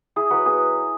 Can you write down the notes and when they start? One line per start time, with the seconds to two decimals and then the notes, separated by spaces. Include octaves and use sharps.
0.16 E4 G#4
0.30 F#3 F#4 B4
0.46 B3 G#4